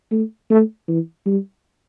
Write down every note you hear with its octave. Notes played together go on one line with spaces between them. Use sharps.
A3
A3
E3
G3